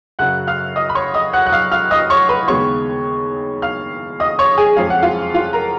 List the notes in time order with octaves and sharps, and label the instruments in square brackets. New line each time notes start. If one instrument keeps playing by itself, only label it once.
[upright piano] F#2 C#3 F#3 C#4 F#5 F#6
F5 F6
D#5 D#6
B5
C#5 C#6
D#5 D#6
F#5 F#6
F#6
F5 F6
F5 F6
D#5 D#6
C#5 C#6
B4 B5
D#2 C#3 G#3 B3 C#5 C#6
F5 F6
D#5 D#6
C#5 C#6
G#4 G#5
F2 F3 G#3 C#4 F5
F#5
F4 F5
F4 F5
A#4 A#5